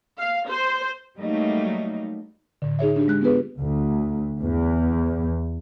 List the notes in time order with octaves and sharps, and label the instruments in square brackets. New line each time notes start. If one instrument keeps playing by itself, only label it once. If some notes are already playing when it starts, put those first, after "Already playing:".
[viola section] F5
C5
[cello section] F#3 G3 A3 A#3 D#4
[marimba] A2 D3
D#4 G#4 C#5 E5
D4 G4
G#3 F#6
B3 D4 F4 G4 G#4 B4
[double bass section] D2
E2